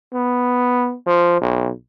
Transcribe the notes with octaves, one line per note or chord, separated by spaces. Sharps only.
B3
F3
B1